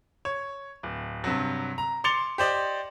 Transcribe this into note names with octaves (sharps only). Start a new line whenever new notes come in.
C#5
D1
G2 C3 F#3
A#5
C6 D6 A6 C#7 F7 G7
G4 C5 D5 D#5